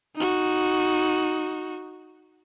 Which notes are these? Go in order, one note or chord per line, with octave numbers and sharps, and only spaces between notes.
D#4 F#4